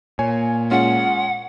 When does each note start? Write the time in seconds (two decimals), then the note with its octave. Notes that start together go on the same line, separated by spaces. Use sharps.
0.19 A#2 C#5 G#5
0.71 G#3 C#4 F4 F#5